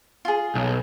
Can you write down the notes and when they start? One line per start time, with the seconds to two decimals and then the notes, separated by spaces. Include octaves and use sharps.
0.25 F4 G#4
0.55 B1